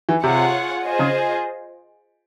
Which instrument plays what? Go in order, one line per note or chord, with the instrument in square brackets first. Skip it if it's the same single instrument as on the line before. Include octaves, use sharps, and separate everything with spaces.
[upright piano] E3
[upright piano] C3 [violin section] F4 G#4 C#5 F#5
[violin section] F4 G#4 C5 D#5
[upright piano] C#3